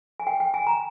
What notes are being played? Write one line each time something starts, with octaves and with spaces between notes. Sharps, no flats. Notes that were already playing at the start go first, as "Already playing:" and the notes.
G#5
G5
G5
G#5
A#5